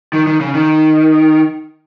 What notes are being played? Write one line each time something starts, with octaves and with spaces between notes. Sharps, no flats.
D#3
D#3
C#3
D#3